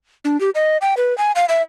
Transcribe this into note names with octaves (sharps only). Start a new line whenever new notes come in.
D4
G4
D#5
G5
B4
G#5
F5
E5